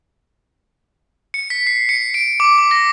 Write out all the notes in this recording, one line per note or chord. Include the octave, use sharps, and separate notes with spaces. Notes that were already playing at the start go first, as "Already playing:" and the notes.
C#7
B6
C7
C#7
D7
D6
D6
A#6